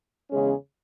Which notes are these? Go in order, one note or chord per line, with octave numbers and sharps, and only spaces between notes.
E2 C#3 G#3 C#4 G#4